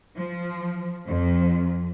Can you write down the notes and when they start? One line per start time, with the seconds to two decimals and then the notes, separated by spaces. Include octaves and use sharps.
0.17 F3
1.06 F2